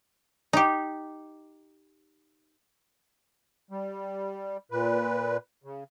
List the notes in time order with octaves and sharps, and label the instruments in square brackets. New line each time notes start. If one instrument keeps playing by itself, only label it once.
[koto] D#4 G4
[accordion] G3
A#2 B4
C#3